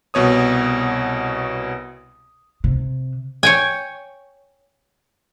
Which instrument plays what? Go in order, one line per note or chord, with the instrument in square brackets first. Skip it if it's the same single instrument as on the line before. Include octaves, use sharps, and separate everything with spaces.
[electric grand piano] C2 B2 C#5 D#6
[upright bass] C3
[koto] C#5 G5 G#5